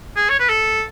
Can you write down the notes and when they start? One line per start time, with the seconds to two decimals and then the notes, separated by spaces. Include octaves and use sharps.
0.16 G#4
0.29 C#5
0.39 B4
0.49 A4